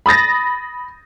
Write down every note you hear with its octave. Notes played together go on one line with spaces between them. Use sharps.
B5 D#6 A6 A#6